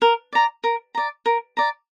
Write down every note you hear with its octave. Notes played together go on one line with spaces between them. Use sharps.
A#4
D5 A#5
A#4
D5 A#5
A#4
D5 A#5